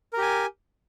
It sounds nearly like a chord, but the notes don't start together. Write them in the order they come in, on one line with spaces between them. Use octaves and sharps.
A#4 G4 G#5